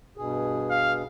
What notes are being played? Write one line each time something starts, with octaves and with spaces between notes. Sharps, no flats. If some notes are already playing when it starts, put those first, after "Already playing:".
G2 B2 G#4
F5